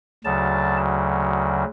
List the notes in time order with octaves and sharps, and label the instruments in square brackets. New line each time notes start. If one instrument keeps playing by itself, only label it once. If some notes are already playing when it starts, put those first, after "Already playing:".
[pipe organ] D2 C#3 F#3 A5